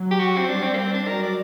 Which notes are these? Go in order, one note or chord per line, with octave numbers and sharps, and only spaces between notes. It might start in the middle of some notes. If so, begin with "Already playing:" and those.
Already playing: F#3
G4
F#4
C4
G3 D4
C4
A#3
C4
D4
F#3 A#4
D5